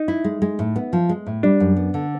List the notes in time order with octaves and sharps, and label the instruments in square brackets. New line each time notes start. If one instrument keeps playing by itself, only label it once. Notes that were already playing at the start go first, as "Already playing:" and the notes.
Already playing: [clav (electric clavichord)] D#4
[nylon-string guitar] E4
G#3
G#3
A2
B3
F3
G#3
A2
[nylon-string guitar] G3 [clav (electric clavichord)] D4
[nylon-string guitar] F#2
B3
D3